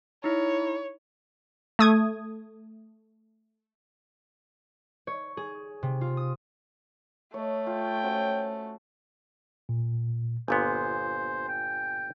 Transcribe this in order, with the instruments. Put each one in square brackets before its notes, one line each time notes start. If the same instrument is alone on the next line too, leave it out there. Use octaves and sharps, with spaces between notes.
[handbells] D#4 E4 [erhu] C#5
[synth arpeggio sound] A3 D#6 G#6
[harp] C#5
G#4
C3
F4
D#6
[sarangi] A3 [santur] C#5 D#5
[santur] F4 [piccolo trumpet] G5
[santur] C#4 F#4 C5
[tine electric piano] A#2
[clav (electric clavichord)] G1 A#2 B3 [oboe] C5 [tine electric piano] G#5
[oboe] G5